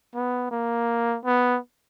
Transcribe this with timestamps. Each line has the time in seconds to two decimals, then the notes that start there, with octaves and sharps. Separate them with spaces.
0.15 B3
0.51 A#3
1.25 B3